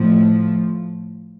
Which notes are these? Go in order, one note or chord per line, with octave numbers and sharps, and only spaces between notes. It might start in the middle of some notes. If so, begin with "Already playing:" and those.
Already playing: A2 F3